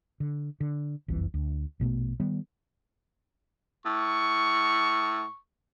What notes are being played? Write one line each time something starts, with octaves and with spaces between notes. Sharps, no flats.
D3
D3
F#1 C2 F2 E3
D2
A#1 B2 A3 B3
D#3 G3 B3
A2 C#6